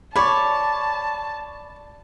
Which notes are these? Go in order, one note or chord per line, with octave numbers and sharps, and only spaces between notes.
C#5 D5 A5 B5 C#6